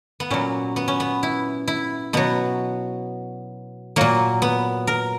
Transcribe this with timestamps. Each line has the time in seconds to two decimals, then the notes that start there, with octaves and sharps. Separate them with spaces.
0.20 B3
0.30 A#2 F#3 C#4
0.76 B3
0.88 C#4
1.00 B3
1.23 E4
1.68 E4
2.13 B2 F#3 B3
3.96 A#2 F#3 A#3
4.42 B3
4.87 A#4